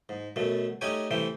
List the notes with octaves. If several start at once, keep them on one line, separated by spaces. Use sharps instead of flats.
G#2
F#2 B2 A3
A3 C#4 D#4 G4 C#5 G#5
C3 E3 A3 G5